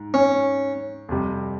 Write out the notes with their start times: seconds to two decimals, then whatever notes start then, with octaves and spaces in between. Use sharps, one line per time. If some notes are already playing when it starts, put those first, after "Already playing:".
Already playing: G#2
0.14 C#4
1.09 F2 C3 G3